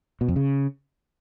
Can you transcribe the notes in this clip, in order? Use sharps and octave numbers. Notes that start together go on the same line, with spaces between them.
B2
F2
C#3